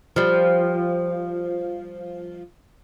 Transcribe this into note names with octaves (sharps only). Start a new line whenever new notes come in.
F3 G3